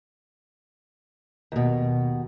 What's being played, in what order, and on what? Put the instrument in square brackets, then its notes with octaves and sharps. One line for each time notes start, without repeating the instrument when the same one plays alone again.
[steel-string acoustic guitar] D#2 B2